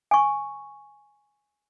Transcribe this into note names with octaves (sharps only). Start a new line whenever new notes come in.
G#5 C#6